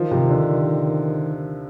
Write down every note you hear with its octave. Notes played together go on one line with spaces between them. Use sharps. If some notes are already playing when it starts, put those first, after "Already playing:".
Already playing: D#3 F3
C3
D3